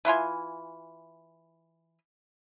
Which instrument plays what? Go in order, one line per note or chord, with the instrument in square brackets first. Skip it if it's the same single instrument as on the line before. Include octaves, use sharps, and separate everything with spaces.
[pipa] E3 E4 F4 G#5